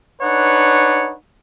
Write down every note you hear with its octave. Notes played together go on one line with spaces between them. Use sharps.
D4 D#4 B4 C#5 F#5